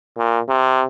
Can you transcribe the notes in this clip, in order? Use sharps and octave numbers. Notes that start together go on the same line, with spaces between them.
A#2
C3